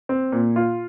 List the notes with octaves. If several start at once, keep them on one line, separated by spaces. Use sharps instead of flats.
C4
A#2
F4